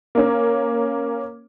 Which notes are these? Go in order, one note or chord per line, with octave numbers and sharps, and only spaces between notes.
A#3 C#4